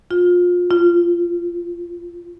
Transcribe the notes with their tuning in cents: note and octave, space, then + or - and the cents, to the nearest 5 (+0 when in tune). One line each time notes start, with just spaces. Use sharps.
F4 +25
F4 -15